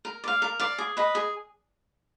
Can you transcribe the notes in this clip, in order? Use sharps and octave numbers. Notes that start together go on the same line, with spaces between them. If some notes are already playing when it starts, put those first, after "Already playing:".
A#4
D5 F5
A#4
D5 F5
G#4
B4 D#5
G#4